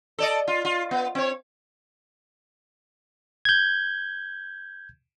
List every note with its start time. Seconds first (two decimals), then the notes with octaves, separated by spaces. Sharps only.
0.18 A4 D5 D#5
0.48 F4
0.65 F4
0.91 B3
1.15 C4 C#5
3.45 G6 G#6